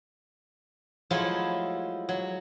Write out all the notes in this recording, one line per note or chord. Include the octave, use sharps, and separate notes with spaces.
F3 F#3 G#3 A3 E4 F4
F#3